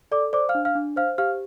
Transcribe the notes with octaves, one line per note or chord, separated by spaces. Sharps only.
A4 D5 D6
C5 D5 D6
F5 F6
D4
F5 F6
D4
C5 F5 F6
G4 F5 F6